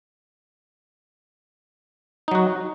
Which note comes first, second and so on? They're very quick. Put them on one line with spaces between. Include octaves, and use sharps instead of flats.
D#4 F#3 F#4